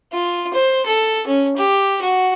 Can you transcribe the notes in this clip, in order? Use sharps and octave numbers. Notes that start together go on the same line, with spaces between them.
F4
C5
A4
C#4
G4
F#4